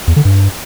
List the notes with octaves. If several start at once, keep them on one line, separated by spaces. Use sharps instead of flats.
E2
D3
G2